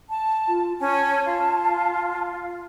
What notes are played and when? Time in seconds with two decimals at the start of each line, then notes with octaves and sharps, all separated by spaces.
0.09 A5
0.48 F4
0.80 C#4 G#5 A5
1.25 F4